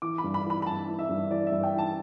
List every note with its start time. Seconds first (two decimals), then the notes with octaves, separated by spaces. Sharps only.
0.02 E3 D6
0.18 B5
0.24 G2
0.34 B5
0.45 E3
0.50 B5
0.62 B5
0.66 G2 A5
0.88 E3
0.99 E5
1.09 G2
1.30 E3 D5
1.47 E5
1.52 G2
1.63 G5
1.74 E3 A5